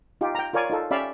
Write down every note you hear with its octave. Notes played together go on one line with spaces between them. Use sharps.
D#4 F4 G4
G5 A#5
F4 A#4 C#5 D5 G#5
D#4 F4 A4
C#4 G4 D5 E5 F5 B5